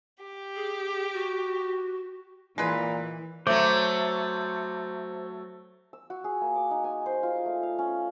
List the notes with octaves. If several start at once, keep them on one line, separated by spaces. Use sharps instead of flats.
G4
G#4
F#4
A#2 E3 G#3 G#4 B4
F#3 A3 C5 D6
E6
F#4
G#4
A#3
D6
D#4
G#5
C5
F4
A3
F5
C#4